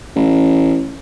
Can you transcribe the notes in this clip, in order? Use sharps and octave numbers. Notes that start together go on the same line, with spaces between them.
A1